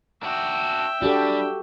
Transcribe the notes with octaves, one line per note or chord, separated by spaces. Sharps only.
D4 F#4 E5 G5
G3 D4 F#4 G4 A4